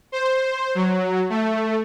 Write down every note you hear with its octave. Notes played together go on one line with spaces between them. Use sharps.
C5
F#3
A3